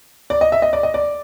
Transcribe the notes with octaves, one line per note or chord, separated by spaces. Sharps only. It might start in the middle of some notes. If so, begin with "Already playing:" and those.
D5
D#5
E5
D#5
D5
D#5
D5